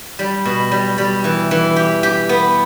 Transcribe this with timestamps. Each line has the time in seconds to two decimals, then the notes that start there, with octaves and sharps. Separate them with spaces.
0.19 G3
0.45 B2
0.71 G3
0.98 G3
1.24 E3
1.51 E3
1.76 G4
2.03 G4
2.29 B3